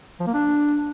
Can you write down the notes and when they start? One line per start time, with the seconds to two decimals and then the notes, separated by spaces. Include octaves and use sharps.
0.20 F3
0.27 A#3
0.34 D4